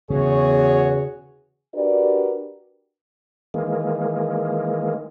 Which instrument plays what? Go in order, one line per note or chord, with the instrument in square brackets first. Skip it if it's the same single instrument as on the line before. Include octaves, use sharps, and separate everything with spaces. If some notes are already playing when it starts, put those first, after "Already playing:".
[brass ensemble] E2 F#4 C#5 [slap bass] C#3 [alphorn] G#4
[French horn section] D4 F#4 G4 A#4 B4 D5
[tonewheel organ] D#3 E3 G#3 A#3